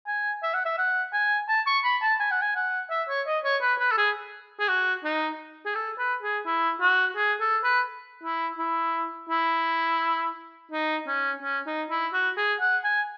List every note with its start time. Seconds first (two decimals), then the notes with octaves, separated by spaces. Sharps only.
0.07 G#5
0.43 E5
0.54 F#5
0.65 E5
0.78 F#5
1.13 G#5
1.49 A5
1.67 C#6
1.84 B5
2.02 A5
2.20 G#5
2.31 F#5
2.41 G#5
2.56 F#5
2.91 E5
3.09 C#5
3.27 D#5
3.44 C#5
3.61 B4
3.79 B4
3.92 A4
3.97 G#4
4.60 G#4
4.68 F#4
5.04 D#4
5.66 G#4
5.75 A4
5.98 B4
6.22 G#4
6.46 E4
6.81 F#4
7.16 G#4
7.40 A4
7.64 B4
8.23 E4
8.58 E4
9.29 E4
10.71 D#4
11.07 C#4
11.43 C#4
11.66 D#4
11.90 E4
12.13 F#4
12.37 G#4
12.61 F#5
12.84 G#5